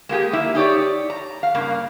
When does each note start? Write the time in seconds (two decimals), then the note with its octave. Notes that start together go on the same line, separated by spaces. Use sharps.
0.09 G#3 A#3 G4 G#4
0.33 A#3 E4 E5
0.55 D#4 G4 C#5 D5
1.10 A#5
1.43 F5
1.54 G2 C#3 A#3